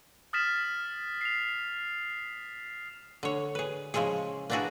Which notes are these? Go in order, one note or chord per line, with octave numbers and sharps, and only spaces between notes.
D#6 F6 A6 B6 E7
C7 F7
D3 C#5
G#4 B4
C#3 F3 G#3 E4 G#4
A#3 B3 D4 E4 F#4 G#4